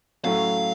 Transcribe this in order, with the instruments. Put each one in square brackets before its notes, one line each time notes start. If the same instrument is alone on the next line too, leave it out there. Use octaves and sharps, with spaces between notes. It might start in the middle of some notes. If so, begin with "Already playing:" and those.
[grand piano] A2 F#3 A3 C#4 [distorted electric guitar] F5